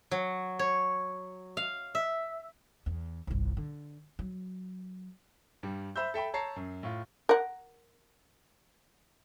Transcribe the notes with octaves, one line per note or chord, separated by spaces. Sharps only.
F#3
C#5
F5
E5
E2
G1 C2
D3
F#3
G2 G3
C5 E5 B5 E6 G6
A4 E5 G5 B5
C#5 A5 A#5 C7
F#2
A2 F4
A#4 F#5